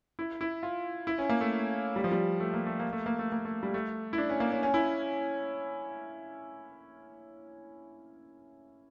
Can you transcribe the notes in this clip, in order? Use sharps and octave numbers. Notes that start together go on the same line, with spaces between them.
E4
E4
F4
E4
C#4
A#3
A3
G3
F3
G3
A3
A#3
A3
A#3
A3
A#3
A3
A#3
A3
G3
A3
E4
D4
C#4
A#3
C#4
C#4
E4